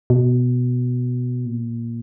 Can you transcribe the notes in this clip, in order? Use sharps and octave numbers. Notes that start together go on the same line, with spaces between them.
B2
A#2